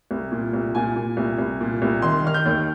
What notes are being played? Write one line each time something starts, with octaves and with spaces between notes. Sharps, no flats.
C2
A#2
C2
A#2 G#5
A#2
C2
C2
A#2
C2
D#3 C6
D#3 F6
G6
D#2